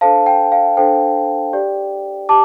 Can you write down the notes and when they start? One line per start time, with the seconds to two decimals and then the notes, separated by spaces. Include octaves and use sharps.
0.01 D4 A4 C5 F5 A5
0.26 G5
0.52 F5
0.77 D4 A4 C5 G5
1.53 G4 D5
2.29 G4 A5 D6